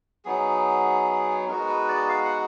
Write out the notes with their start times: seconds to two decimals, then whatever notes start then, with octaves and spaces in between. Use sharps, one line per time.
0.25 F#3 B3 D#4 G#4
1.48 G#3 B3 D#4 F#4 A#4
1.68 B4
1.89 D5
2.09 F5
2.25 F#5